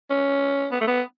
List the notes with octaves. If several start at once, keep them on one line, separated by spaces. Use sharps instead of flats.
C#4
B3
A3
B3